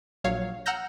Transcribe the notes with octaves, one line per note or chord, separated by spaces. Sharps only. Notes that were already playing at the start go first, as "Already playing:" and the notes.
A#1 F#3 C#5 F5
F#5 A#5 E6 F6 G6 A#6